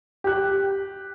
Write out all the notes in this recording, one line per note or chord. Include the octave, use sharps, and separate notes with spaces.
G4 F#6